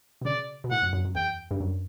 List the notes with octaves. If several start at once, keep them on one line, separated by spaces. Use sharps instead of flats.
B2
C#3 D5
B2
A2 F#5
F#2
F#2
F#2
E2 G5
G2
F#2